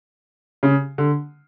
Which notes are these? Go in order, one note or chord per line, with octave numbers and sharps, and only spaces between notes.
C#3
D3